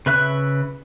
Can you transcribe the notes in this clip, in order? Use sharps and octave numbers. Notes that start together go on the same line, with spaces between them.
C#3 B4 E5 F#6